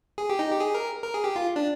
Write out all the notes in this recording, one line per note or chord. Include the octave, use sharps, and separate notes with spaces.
G#4
G4
D#4
G4
G#4
A#4
A#4
G#4
G4
F4
D4